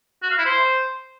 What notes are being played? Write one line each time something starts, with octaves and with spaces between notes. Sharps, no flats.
F#4
F5
E4
C5